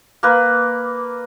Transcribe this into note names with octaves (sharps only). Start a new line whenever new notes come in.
A#3 B4